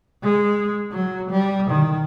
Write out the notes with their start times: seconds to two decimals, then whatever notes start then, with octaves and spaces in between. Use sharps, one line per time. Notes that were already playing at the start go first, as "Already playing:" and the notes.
0.22 G#3
0.92 F#3
1.30 G3
1.70 D#3